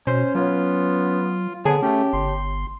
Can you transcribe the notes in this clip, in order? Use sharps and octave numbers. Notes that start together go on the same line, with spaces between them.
B2 C#4 C5
F#3 B3 F4
D3 B3 G#4 C#5 A5
A3 C#4 G4
G1 C6